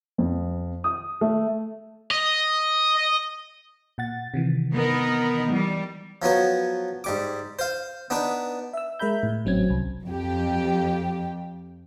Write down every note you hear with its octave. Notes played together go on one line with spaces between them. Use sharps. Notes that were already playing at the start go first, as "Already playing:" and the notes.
F2
D#6
A3
D#5
A#2 F#5 A6
C3 D#3 E3
B3 D#4 A#4
E3 G3
F3 F#3 B3 C#5
G#2 G3 D6
C5 F5
B3 D4 D#4 B4
E5 E6
G#3 A#4 E5 A#5 B5 G6
A2
G#1 F#3 C4 C#4 G#6
C2
F2 G4